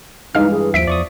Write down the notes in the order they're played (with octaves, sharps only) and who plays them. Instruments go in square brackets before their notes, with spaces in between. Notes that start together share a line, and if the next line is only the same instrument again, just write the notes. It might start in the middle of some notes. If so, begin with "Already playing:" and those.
[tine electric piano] G2 E3 [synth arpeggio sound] G#3 F5 F6 [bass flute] D#4
[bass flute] G#4
[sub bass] D#2 [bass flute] F3 [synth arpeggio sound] E5 B6 D7
[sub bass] E2 [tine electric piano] D5 C#6 D#6